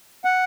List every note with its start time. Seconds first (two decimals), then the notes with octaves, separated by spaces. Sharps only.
0.25 F#5